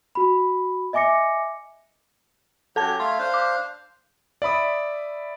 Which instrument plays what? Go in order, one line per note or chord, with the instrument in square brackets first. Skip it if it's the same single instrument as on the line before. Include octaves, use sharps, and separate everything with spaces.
[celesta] F#4 B5
D#5 E5 G#5 D6 A#6 C#7
[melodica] F#3 C#4 G4 [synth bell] A4 A5 G#6
[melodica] A3 F5 [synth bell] C6
[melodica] D4 C5 F5
[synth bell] D6
[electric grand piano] D5 E5 B5 D#6